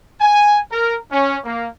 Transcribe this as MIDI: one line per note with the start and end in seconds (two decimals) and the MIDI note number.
0.20 0.59 80
0.70 0.95 70
1.10 1.38 61
1.44 1.66 58